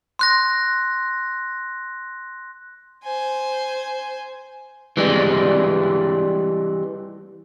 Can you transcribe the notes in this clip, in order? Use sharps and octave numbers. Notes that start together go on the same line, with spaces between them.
C6 F#6 A#6
C5 G#5
E3 G3 G#3